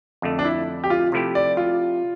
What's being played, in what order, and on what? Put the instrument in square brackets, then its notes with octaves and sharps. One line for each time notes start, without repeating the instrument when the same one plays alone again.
[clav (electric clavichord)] F2 D3 A3
[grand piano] D4
E4
G4
F4
[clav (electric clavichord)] C3 F3 A3 E4 G4
[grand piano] D5
F4